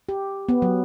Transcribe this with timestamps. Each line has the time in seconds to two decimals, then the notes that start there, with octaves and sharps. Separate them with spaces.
0.09 G4
0.49 B3
0.62 F#3